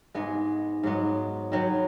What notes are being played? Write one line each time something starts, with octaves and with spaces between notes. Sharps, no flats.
G#2 G#3 B3
G#2 F#3 B3
D#3 F#3 B3